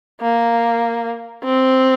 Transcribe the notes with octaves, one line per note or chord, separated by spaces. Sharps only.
A#3
C4